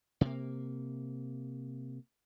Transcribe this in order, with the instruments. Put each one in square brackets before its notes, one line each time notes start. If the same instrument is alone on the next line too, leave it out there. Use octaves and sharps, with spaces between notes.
[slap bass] C3 A#3